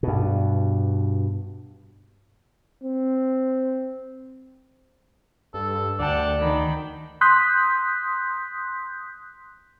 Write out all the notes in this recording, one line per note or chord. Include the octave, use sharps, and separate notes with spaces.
G2 B2
C4
G2 A4
D2 D5 F#5 G5 A5
D#3 G5 B5
C6 D#6 F#6 G6 B6